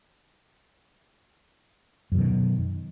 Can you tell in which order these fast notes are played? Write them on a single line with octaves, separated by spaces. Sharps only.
F#2 E3 B2 D#3